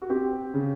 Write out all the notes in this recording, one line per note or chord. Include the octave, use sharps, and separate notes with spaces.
F#4
C4 G4
C#3